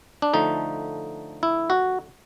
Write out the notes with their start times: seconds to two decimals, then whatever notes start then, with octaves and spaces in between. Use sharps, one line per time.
0.22 D4
0.34 D3 F3 A3 D#4
1.43 E4
1.70 F#4